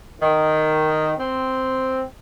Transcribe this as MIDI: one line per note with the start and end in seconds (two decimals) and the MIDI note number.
0.21 1.12 51
1.18 2.01 60